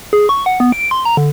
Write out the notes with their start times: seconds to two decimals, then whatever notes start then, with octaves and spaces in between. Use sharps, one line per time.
0.13 G#4
0.29 C#6
0.46 F#5
0.60 B3
0.72 D7
0.91 C6
1.05 A#5
1.17 D3